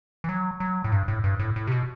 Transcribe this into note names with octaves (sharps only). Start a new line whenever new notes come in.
E3
F#3
F#3
A2
G2
A2
G2
A2
A2
C3
B2